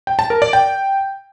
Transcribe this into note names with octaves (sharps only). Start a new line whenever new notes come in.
G5
A5
A#4
D5
G5